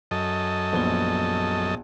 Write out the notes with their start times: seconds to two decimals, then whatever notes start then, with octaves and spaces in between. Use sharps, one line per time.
0.11 F#2 A4 D#5
0.73 A#1 B3 G7